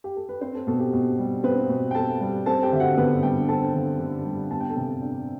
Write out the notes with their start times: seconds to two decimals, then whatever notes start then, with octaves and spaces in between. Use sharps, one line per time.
0.04 G4
0.16 A4
0.29 B4
0.41 C4 C5
0.55 A4
0.67 B2 A4
0.80 G4
0.93 B2
1.18 G3
1.44 B3 C4 B4
1.69 B2
1.91 G5
1.95 B2 A4 A5
2.21 G3
2.46 C4 A4 A5
2.63 G4 G5
2.72 D3 E5
2.80 F#4 F#5
2.97 D3 B3 B4
3.23 G3 G4 G5
3.48 C4 A4 A5
3.74 D3
3.99 D3
4.25 G3
4.51 B3 A5
4.60 G5
4.70 A4 A5
4.76 C3
5.02 D4